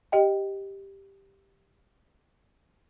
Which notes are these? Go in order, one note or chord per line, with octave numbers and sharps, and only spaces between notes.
G4 D#5 G5